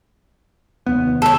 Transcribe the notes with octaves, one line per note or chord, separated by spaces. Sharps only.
F1 D#2 B3
A4 C#5